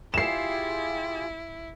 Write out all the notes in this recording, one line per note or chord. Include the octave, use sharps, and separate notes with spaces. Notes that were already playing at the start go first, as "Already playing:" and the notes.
E4 F4 G4 G#4 C7 E7